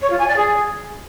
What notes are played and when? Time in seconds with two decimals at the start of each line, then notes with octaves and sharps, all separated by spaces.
0.01 C#5
0.10 F4
0.19 G#5
0.28 D5
0.36 G#4